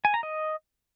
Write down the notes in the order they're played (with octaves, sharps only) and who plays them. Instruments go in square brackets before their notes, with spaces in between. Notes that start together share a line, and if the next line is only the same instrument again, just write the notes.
[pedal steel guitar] G#5
A#5
D#5